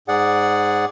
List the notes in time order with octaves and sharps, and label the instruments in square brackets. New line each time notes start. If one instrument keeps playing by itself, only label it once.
[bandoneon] G#2 G#4 D5 F#5